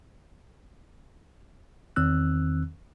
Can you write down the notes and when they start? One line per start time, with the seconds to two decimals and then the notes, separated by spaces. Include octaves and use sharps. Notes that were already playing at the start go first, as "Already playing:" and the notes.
1.96 E2 D#3 C4 E6 F#6